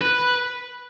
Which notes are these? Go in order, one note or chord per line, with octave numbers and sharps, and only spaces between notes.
B4